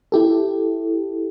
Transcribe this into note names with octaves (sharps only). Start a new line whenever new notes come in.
E4 G4 A4